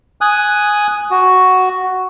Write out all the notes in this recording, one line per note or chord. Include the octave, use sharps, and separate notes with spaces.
G#5 D#6 F#6
F#4